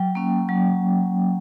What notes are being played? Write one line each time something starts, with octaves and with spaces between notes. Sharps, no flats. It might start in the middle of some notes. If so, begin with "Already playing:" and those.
Already playing: F#3 G5
A#3 C#4
F#3